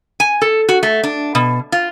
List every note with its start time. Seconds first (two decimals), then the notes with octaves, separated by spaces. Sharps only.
0.20 G#5
0.42 A4
0.69 F#4
0.83 A3
1.04 D4
1.35 B2
1.72 F4